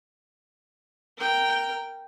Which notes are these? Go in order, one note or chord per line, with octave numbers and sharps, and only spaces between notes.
A#4 G5